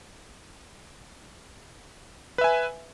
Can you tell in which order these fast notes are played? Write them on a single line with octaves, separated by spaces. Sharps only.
B4 E5 G#5